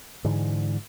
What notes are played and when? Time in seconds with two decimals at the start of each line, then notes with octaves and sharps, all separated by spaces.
0.24 G#2 D3 E3